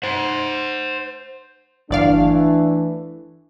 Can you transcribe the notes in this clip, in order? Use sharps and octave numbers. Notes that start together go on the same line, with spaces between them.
C5 F#5
G1 E3 A3 D4 D5 F5